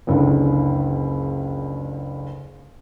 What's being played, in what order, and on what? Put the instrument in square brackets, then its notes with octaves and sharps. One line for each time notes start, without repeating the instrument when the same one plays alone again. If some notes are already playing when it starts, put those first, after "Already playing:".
[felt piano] F#1 C#2 D3